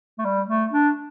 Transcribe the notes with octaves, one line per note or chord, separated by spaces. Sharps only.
A3
G3
A3
D4